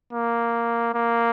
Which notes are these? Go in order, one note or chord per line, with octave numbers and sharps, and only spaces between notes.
A#3
A#3